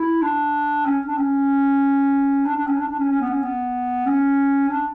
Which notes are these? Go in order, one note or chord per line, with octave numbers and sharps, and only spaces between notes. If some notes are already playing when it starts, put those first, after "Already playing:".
Already playing: E4
D4
C#4
D4
C#4
D4
D4
C#4
D4
D4
C#4
C#4
B3
C#4
B3
C#4
D4